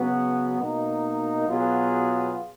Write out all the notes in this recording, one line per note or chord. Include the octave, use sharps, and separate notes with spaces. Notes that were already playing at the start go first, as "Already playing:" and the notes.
Already playing: C#3 F#3 B3 F#4
B2 A#3 D#4
B2 F#3 B3 F4 G#4